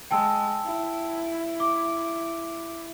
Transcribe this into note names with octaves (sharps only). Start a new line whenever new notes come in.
G#3 G5 A5 E6
E4
D6